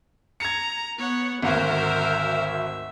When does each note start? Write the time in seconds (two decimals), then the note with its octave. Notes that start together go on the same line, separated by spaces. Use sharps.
0.40 A#5 G#6 C#7
0.98 B3 C#5 F#5
1.42 G#1 D2 F#4 A#4 C5 E5